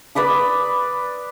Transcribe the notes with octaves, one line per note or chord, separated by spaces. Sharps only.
B4 D5 B5 D#6